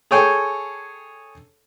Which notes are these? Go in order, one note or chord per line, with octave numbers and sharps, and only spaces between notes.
G#4 A4 C#5 G5 G#5